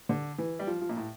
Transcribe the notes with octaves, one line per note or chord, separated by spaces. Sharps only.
D3
E3
G3
F3
F3
A#2
A2